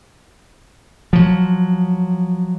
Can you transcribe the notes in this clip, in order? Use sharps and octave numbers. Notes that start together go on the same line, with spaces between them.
F3 F#3